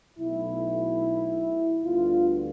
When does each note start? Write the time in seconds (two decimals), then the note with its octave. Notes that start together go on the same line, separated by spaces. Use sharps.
0.19 B1 B2 A3 E4
1.84 D2 D3 G3 B3 F4